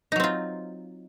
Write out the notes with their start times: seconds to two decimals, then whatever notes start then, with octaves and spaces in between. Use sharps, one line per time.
0.12 D#4
0.16 F#3
0.20 C4
0.24 F4